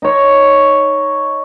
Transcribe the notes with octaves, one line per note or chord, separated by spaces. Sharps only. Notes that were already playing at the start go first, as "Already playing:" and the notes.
D#4 C#5